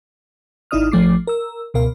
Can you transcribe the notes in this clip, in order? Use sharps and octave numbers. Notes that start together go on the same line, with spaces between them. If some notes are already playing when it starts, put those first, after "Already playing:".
G#1 D#4 E4 D5 D#6 F6
A1 F3 A3 D6 C7
A#4 E6
C#2 B2 A#4 F5